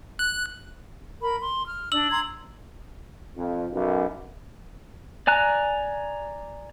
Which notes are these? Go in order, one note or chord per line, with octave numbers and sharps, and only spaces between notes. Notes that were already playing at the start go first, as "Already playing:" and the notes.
F#6
A#4 B5
C6
F6
D4 D5 E6 F#7
A#5 C6 G#6
F2
B1 F#2
D5 G#5 A#5 F#6